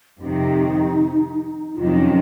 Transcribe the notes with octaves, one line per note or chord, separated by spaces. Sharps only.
F2 C3 D#3 D#4
F2 C3 D#3 F#3 F4
D#4
C#4